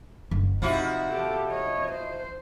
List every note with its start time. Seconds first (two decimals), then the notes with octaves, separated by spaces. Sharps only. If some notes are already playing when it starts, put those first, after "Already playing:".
0.31 F#1
0.62 C3 F3 D#4 E4 F#4
1.10 G4 A4
1.49 C#5 D#5
1.92 C5